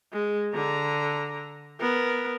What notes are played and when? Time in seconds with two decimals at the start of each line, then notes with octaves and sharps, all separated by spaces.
0.12 G#3
0.54 D3 A#5
1.80 B3 A#4